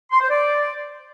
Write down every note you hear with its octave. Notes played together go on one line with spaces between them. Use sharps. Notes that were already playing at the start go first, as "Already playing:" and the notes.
C6
C5
D5